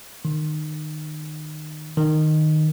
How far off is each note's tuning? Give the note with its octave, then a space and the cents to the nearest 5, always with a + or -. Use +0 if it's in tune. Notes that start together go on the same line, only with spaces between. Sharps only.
D#3 -25
D#3 -10